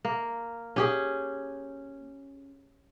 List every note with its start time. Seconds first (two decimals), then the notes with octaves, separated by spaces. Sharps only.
0.05 A#3
0.76 C#4 G4 G#4